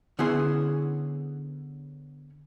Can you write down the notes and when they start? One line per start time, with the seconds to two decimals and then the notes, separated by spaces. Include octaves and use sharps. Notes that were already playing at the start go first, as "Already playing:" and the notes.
0.19 D3 B3 C#4 E4 G#4 C6